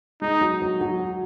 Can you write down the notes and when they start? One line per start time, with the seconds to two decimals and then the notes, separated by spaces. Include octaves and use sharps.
0.22 G#3 D#4
0.41 F#3
0.62 F#3
0.81 F#3